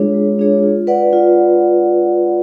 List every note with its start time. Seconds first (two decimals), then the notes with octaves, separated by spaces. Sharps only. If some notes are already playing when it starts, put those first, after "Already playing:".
Already playing: G#3 D4 F4 G#4 C#5
0.14 G#3
0.39 D4 F4 G#4 C#5
0.63 F4
0.87 B4 D5 F#5
1.13 F4